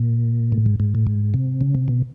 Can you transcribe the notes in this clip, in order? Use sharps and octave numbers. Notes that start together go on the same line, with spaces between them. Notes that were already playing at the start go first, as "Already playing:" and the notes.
Already playing: A#2
A2
G#2
G#2
A2
G#2
C3
C#3
C3
B2